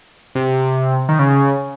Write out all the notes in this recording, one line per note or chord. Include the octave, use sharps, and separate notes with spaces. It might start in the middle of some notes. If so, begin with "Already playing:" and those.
C3
D#3
C#3